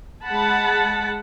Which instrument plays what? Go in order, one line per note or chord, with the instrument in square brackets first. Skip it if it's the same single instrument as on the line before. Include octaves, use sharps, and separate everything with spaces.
[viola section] G#3 F#5 A5 B5